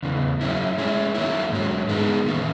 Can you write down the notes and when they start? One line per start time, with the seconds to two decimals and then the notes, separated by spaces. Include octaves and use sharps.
0.03 E2 C#3 E3
0.41 F#3 C#4 E4
0.78 G#3 C#4 E4
1.15 D#3 F#3 A#3 E4
1.52 G#2 F#3 C#4
1.89 D#3 G#3 B3
2.26 E2 D#3 A#3 C#4